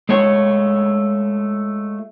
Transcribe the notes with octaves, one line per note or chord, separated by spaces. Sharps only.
G#3 A3 F4 C#5